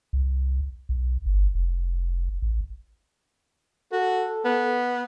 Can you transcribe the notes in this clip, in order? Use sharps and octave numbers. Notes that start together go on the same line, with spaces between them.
C2
B1
G1
F1
A1
F#4 A4
B3